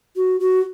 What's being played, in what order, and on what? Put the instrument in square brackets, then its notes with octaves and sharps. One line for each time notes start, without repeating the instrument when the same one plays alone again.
[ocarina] F#4
F#4